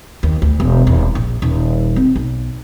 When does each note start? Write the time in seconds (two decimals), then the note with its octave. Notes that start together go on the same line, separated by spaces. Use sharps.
0.23 D#2
0.42 D2
0.60 E1
0.87 D#1
1.15 A#1
1.42 D#1
1.96 C4
2.15 B1